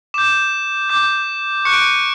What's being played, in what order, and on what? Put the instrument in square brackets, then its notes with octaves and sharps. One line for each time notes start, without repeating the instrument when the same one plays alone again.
[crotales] D6 G6 E7
D6 G6
C#6 F#6 C#7
D7
C#7